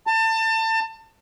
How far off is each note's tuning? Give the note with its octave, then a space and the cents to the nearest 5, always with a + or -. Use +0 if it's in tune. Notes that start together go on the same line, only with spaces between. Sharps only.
A5 +30